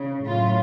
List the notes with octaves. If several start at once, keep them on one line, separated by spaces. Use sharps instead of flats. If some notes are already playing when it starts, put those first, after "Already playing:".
Already playing: C#3
A2 F#3 F4